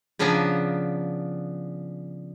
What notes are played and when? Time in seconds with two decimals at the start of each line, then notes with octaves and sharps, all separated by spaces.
0.19 C#3 F3 B3 D4 G#5 A#5